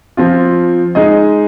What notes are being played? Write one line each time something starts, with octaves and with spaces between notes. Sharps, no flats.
F3 C4 F4
G#3 D#4 G#4 D#5